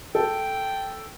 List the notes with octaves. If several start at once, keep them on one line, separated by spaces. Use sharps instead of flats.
A4 G5